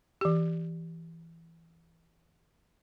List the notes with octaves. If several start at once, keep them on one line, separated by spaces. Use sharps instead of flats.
E3 G4